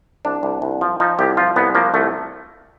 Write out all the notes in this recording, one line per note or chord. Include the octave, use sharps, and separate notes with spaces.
C2 D4
C2
C2
F3
F3 D#4
C2 G4
F3 F4
C2 B3
F3 A#3
C2 A3